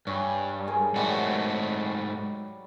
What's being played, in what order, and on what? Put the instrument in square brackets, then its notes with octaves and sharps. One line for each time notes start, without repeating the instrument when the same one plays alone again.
[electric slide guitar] G2 [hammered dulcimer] C#5 G#5
[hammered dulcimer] G#3 G#4 A#4
[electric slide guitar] G#2 A3 F#4 [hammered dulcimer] F#3 G3